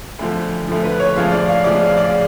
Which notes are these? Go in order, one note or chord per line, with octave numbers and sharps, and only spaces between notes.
D2 D3 F3
D2 D3 F3
B4
C#5
D2 C#3 F3 G#3 F5
D5
F5
D2 C#3 F3 G#3 D5
F5
D5